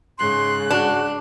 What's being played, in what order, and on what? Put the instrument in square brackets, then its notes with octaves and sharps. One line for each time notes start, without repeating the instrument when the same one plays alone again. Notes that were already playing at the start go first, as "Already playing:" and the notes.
[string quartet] G#2 C#3 F#6 [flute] C6
[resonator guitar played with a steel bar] D4 [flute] F#4